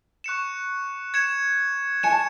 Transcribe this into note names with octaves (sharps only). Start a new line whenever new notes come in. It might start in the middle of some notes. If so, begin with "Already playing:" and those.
C#6 F#6 C#7 E7
G#6 C#7 E7
G#5 G#6 C#7 E7
A5